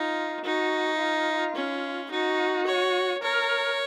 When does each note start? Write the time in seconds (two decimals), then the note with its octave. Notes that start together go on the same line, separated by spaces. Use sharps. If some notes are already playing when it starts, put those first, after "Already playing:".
Already playing: D#4 F4
0.44 D#4 F#4
1.00 F4
1.55 C#4
2.11 D#4 F#4
2.67 C#5
3.22 A#4 C#5